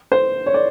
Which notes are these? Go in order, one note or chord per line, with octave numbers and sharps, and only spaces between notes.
C5
C#5
D5